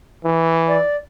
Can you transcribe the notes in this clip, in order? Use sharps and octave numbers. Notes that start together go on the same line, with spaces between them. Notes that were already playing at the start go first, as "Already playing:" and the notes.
E3
D5